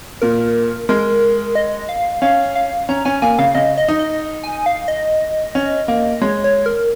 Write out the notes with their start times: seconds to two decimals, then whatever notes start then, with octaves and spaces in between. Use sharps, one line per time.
0.22 A#2 A#4
0.89 G#3 A#4
1.55 D#5
1.89 F5
2.22 C#4 F5
2.56 F5
2.89 C#4 A#5
3.05 C#4 G#5
3.22 A#3 G#5
3.39 C#3 F5
3.55 C#3 D#5
3.78 D#5
3.88 D#4
3.99 D#5
4.43 G#5
4.66 F5
4.88 D#5
5.55 C#4
5.88 A#3
6.22 G#3 C#5
6.44 C#5
6.66 A#4